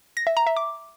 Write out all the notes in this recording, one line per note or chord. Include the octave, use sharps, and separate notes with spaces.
A#6
E5
A#5
E5
D6